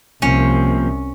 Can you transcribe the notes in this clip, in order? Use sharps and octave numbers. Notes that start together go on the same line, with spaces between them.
C2 C3 F3 A#3 C4 C#4